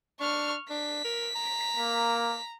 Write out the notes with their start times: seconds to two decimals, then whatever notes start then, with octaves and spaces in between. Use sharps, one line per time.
0.20 D4 C#6 F6
0.70 D4 B6
1.04 A#4
1.36 A#5
1.77 A#3